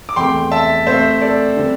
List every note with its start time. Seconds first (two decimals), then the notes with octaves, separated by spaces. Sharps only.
0.09 D6
0.16 E2 C3 A3 G5 C6
0.51 E5 A5
0.87 C3 A3 C4 C5 E5
1.21 A4 D5
1.56 D3 G3 C4